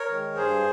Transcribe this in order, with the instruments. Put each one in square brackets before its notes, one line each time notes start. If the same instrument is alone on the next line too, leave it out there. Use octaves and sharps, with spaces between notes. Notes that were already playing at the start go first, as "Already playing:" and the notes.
Already playing: [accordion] A#4 C#5
D#3 G#3
G2 G#4 C5